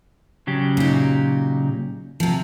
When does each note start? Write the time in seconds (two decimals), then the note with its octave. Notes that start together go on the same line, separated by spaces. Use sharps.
0.47 C#3 F#3 G4
0.77 A#2 D#4
2.20 C3 F3